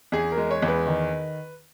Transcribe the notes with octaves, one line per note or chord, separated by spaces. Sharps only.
E2 G#4
A#4
G#3
C#5
E2
B4
D#3